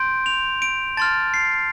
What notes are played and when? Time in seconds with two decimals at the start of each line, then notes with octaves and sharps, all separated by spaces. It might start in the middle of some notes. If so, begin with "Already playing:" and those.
Already playing: C6 G6 D7
0.26 F7
0.62 D7
0.97 A5 C6 F6 A6
1.34 C7